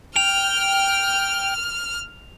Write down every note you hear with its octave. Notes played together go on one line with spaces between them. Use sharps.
G5 F6 F7